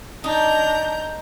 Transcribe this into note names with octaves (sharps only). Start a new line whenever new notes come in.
D4 D#4 A#5 G6